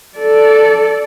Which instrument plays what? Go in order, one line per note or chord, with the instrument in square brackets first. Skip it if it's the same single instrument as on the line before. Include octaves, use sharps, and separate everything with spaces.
[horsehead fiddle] A4 D5